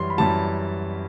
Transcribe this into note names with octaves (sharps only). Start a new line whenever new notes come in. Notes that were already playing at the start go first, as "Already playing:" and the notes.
Already playing: F#2 E3 G3 C6
B5
F#2 E3 G3 A5